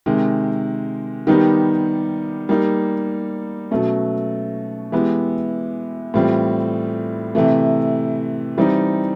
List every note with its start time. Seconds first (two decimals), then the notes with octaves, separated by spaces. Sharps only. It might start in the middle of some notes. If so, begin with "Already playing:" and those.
0.06 C3 D#3 G#3
1.27 D#3 G3 B3 D#4 G4
2.49 G3 A#3 D#4
3.71 B2 F#3 A3 C#4
4.92 E3 G#3 B3 E4 G4
6.14 A2 E3 G3 C4 F4
7.35 C3 E3 A3
8.57 E3 G3 C4 D#4